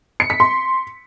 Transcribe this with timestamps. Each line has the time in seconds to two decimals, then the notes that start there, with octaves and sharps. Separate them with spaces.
0.20 C#7
0.30 B6
0.40 C6